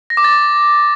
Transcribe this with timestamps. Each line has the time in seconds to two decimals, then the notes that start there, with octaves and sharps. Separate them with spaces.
0.10 A#6
0.17 D6
0.24 A6